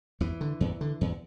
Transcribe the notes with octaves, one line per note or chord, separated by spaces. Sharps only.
E2 E3
D3
E2
D3
E2